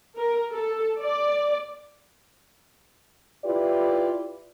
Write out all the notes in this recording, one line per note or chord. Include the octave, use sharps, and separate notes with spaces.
A#4
A4
D5
E4 F4 G4 B4 D5